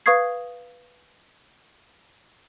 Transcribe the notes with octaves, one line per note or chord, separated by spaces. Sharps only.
B4 F5 C#6 D#6 G#6 C7